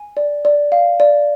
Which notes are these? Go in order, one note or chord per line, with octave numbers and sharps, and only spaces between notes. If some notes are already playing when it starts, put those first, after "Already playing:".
Already playing: G#5
D5
D5
F5
D5